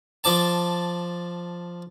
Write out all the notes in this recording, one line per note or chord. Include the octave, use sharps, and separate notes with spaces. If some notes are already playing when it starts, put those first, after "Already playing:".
F3 D5 A5